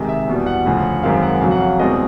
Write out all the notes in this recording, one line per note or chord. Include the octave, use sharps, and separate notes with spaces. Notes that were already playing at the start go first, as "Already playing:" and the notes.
Already playing: C3 D#3 G#3 D#5
E5
E2 B2 G3
F#5
D2 C#3 F3
F#2 D#3 G#3 C4 F5
F#5
F2 C#3 F#3 F5
F#5
F5
C2 B2 G#3 C4 D#5